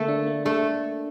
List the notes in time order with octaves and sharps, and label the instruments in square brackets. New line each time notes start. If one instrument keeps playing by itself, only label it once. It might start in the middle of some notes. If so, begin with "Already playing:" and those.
Already playing: [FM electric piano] D3 A#3 [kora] A3 A4
[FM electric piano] D4
A#3
[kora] A3 A4 [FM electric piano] D4